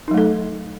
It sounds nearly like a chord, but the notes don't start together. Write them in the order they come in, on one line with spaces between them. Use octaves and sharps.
D#4 F#3 A3 A4